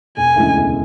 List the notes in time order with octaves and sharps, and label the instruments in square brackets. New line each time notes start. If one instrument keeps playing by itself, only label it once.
[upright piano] E1 [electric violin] G#5
[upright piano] D2 C#3 E3 G#3
E1